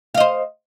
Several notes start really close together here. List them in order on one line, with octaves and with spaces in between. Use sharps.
F5 D#5 C5